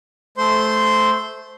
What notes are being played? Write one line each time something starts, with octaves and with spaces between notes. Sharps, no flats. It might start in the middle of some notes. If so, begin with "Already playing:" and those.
A3 C5 C6